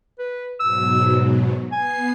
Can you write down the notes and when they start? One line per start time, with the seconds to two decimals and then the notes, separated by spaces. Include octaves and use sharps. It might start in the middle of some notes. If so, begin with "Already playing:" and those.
0.19 B4
0.60 G#2 B2 F#3 E6
1.72 B3 G#5 C7